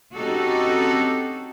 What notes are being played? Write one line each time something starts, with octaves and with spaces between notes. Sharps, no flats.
C4 C#4 D#4 F#4 G4 A4